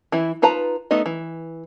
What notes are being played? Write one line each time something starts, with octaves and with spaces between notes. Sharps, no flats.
E3 E4
D#4 F4 B4 A5 A#5
A3 B3 D#4 D#5
E3